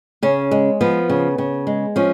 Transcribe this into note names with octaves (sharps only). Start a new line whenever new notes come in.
C#3 C#4
G#3
F3 B3
C#3
C#3
G#3
F3 C#4